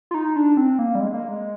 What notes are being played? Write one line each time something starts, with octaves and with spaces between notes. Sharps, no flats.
F4
D#4
D4
C4
A#3
G3
G#3
A#3
G#3